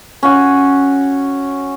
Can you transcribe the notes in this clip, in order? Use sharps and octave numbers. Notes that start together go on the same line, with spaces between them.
C#4 F#4